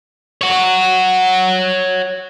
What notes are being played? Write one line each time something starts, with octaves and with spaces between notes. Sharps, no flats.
C#5 F#5